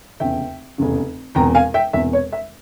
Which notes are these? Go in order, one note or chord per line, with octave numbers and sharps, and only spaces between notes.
F1 E2 C#3 E5 G5
F1 E2 C#3
E1 E2 C3 G5 A#5
F5 G#5
E5 G5
E1 E2 C3 E5
C#5
E5